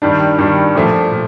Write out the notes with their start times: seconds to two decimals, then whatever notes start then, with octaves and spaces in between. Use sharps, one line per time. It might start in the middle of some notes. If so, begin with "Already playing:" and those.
0.02 G2 D#3 G3 D4
0.38 G2 D#3 G3 D4
0.75 A#2 F3 A3
1.11 A#2